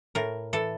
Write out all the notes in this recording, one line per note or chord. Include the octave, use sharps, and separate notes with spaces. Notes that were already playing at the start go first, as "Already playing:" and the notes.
A2 A#4
E3 A4